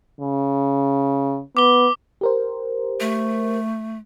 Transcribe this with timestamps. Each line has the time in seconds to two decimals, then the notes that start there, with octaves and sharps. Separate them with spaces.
0.20 C#3
1.57 B3 D6 G7
2.21 G4 A#4 C5
3.00 A3